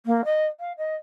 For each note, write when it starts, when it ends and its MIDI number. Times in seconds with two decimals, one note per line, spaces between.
0.06 0.25 58
0.25 0.46 75
0.60 0.73 77
0.78 0.95 75